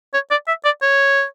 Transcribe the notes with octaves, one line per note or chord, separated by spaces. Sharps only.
C#5
D5
E5
D5
C#5